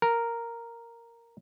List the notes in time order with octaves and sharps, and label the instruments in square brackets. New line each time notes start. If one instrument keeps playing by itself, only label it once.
[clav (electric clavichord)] A#4